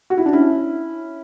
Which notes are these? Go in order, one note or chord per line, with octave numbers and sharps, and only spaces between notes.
F#4
E4
D4
C#4 E4